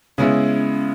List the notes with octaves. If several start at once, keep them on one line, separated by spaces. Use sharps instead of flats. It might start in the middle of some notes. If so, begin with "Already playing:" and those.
C#3 G#3 B3 C#4 E4